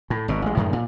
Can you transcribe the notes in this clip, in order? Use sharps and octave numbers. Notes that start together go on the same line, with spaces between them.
A2
G#1 B2
A1 G#3
F#2 A2 D#3 G#3
A#2